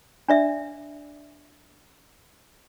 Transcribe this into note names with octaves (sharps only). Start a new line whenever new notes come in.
D4 D5 E5